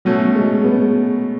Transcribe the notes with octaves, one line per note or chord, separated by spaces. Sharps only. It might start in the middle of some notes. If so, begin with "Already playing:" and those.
B2 F#3 A3 C#4
G#3
G#3 B3